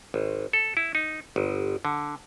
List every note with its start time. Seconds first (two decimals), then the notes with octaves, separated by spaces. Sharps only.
0.14 G#1
0.53 A4
0.77 E4
0.95 D#4
1.36 G1
1.85 D3